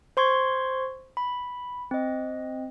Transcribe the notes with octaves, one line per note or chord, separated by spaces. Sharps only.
C5 C6 C#6 G#6
B5
C4 D#5